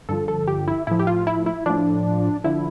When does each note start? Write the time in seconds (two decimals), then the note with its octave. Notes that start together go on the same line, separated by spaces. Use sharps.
0.09 G2 D3 F3 A4
0.28 A4
0.48 G4
0.68 E4
0.87 A2 F3 E4
0.99 G4
1.07 F4
1.27 E4
1.46 E4
1.66 A2 F3 D4
2.44 D3 F3 E4